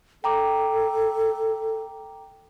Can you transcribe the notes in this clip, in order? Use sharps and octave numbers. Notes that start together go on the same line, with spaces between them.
A4 G5 A#5 D6